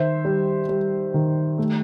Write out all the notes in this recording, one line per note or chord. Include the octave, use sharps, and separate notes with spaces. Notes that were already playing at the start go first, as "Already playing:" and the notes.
Already playing: D#3 C5 E5
G3
G3
D#3
A3